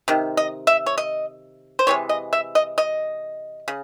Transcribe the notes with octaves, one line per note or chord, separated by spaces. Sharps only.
C3 D#3
D#5
E5
C#5
D#5
C5
C3 E3 G#3 C#5
D#5
E5
D#5
D#5
C#3